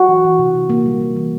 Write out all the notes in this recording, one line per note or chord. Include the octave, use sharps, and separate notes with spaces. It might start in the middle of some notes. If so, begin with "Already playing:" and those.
Already playing: F#4
E3
E3
C3
C3
A#3
G3
G3
E3